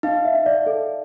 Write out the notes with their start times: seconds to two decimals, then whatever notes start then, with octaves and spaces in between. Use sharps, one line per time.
0.03 D#4 F5
0.25 E5
0.35 D#4
0.46 D5
0.66 D#4 A4